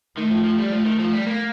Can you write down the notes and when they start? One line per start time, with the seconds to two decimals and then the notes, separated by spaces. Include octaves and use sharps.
0.17 D#3 A3
0.30 F3
0.44 F3
0.58 G3
0.72 F3 A3
0.86 D#3
0.99 F3
1.13 G3
1.27 A#3